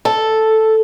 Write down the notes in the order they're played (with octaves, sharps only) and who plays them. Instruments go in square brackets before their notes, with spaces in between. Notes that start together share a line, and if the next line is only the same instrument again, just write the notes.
[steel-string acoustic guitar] A4